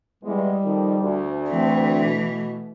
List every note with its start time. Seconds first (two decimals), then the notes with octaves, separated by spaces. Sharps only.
0.24 E2 G3 G#3
0.64 F2 D#3
1.01 D2
1.49 E3 A3 C4
2.04 B2